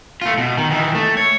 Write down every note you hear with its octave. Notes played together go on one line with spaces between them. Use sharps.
A3 F4
B2
D#3
D#3 E3
A3
C#5